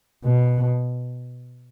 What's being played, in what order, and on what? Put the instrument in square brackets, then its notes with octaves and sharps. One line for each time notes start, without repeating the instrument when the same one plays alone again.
[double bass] B2